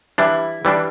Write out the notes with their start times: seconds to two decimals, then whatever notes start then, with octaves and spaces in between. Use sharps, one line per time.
0.18 E3 G3 D4 E4
0.65 E3 G3 D4